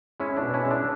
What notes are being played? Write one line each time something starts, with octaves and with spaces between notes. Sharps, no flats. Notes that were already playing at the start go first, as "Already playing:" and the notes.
G#3 C#4 E4
D4
B2
C#4 E4
G#3
D4